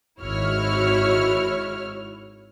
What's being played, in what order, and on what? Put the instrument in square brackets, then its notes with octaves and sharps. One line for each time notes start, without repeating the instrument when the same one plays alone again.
[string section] G#1 E4 F#4 C#5 F6